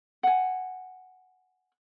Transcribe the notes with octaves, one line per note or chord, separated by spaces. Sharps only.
F#5 G#5